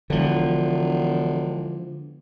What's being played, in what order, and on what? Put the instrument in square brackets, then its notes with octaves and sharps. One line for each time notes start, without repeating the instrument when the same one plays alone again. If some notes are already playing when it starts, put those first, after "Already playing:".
[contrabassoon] E1 [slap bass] D3 F3